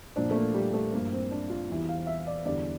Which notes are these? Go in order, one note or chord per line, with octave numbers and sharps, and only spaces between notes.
A#2 F3 D4
A3
A#3
G3
A3
G2 F3 A#3
C4
D4
F4
E2 E3 G3
F5
E5
D5
E2 D3 G3 D5